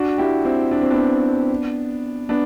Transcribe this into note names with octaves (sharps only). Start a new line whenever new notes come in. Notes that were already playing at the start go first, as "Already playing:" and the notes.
Already playing: D4 F#4
E4 G4
C4 E4
D4
C4
B3 D4
B3 D4